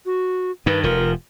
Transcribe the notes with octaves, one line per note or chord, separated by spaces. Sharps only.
F#4
G2 D#3 B4
F1 F3 A#4